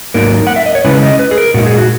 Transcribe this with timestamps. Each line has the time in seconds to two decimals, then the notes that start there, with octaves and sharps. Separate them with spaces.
0.14 G#2 F#3 A#3 D#4 A#4
0.47 F#5
0.56 E5
0.66 D#5
0.75 C#5
0.85 C#3 G#3 C#4 E4 B4
1.03 D#5
1.19 B4
1.31 G#4
1.38 A#4
1.54 A#2 G#3 D#4 F#4
1.66 G#4
1.77 F#4